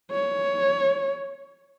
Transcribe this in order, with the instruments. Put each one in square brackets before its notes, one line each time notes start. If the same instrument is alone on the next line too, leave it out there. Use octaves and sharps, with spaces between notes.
[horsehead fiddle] C#5